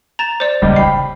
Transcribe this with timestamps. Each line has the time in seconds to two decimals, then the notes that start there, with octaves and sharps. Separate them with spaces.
0.19 A#5 A6 E7
0.40 C5 D5
0.62 D#1 C#2 G3 G#3 D#5
0.76 C#3 G3 G5 B5 C7